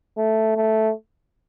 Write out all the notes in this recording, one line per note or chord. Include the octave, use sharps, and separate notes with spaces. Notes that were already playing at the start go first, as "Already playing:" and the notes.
A3
A3